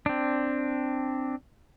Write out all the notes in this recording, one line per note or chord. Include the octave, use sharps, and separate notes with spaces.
C4 D4